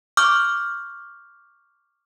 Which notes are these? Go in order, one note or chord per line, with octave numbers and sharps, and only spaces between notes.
C#6 D6 F6 G6